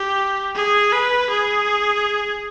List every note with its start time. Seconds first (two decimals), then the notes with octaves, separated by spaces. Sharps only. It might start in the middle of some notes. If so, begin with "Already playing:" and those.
Already playing: G4
0.55 G#4
0.92 B4
1.30 G#4